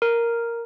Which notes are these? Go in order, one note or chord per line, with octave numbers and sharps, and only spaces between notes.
A#4